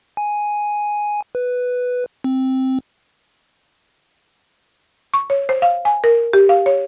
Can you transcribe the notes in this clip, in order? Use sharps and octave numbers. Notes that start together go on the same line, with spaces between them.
G#5
B4
C4
C#6
C#5
C5
F5
G#5
A#4
G4
F5
C#5